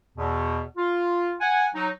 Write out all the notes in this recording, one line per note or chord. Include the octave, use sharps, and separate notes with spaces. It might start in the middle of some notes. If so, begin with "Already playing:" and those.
E2 B2
F4
F#5 G#5
F#3 D#4